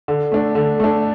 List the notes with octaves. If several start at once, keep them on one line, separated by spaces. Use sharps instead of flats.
D3
A3 D4
D3
A3 D4